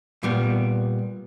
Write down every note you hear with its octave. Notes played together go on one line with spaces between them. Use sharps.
A#2 G3 B3